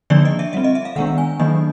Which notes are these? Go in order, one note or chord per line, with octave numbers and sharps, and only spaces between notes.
D3 F3 A#3 D4 D5
D#5
E5
G3 C4 E5
D#5
E5
F5
D#3 G#3 B3 D4 F#5
G#5
D#3 F#3 A#3 D4 D#5